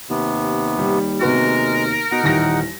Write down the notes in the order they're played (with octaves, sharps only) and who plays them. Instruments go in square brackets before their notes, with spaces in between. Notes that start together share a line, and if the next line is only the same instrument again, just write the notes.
[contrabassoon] D#2 [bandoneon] C3 B3
[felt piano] G3
[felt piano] C3 B3 F#4 [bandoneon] G#3 [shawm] A#4
[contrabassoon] B2 [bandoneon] D#4 F#5
[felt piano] D#1 D#2 A#6 [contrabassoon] E3